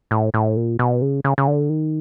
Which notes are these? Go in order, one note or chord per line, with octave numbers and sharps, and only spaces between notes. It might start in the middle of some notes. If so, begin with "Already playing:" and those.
A2
A2
A#2
B2
C#3
C#3
C#3
D3
D#3